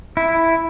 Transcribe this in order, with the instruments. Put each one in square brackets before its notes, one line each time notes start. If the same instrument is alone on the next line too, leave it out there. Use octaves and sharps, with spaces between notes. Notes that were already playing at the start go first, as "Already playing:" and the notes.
[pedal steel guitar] E4